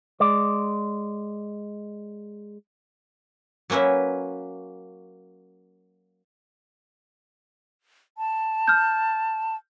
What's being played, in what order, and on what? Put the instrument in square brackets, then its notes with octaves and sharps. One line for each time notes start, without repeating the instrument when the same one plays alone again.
[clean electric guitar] G#3 D5
[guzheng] F#3 A#3 C#4 B4 E5
[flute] A5
[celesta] F6 G6